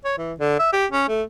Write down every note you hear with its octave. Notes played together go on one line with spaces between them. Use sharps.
C#5
E3
D3
E5
G4
C#4
A3